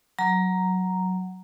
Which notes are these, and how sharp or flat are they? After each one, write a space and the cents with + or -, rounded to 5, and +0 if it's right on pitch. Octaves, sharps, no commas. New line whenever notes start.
F#3 +0 A#5 +0